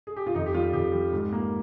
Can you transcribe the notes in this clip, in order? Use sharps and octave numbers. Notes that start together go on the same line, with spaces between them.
G#4
G4
F4
F2 D#4
G4
G3 F4
F2 G4
G3
G#2
A#3